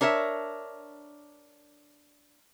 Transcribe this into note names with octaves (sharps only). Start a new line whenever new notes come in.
D4 A#4 C#5 D5 E5